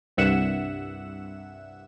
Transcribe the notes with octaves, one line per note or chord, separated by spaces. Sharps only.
C2 G2 E5 F#5 E7